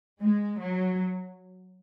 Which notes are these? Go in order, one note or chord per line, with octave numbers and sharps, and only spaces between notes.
G#3
F#3